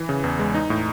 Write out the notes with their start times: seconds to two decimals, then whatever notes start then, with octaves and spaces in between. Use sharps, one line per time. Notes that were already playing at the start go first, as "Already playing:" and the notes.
Already playing: E3
0.09 C#3
0.24 E2
0.39 G#3
0.55 D#4
0.70 A2